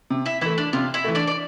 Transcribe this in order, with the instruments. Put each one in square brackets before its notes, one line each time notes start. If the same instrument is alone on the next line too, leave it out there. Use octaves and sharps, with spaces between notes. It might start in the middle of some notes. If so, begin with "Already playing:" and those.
[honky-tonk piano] C3
[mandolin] E4 E5
[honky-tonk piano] E3 A3 [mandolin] E4 E5
[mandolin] D4 D5
[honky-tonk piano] C3 [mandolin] F4 F5
[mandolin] E4 E5
[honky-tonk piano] E3 A3
[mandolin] D4 D5
D5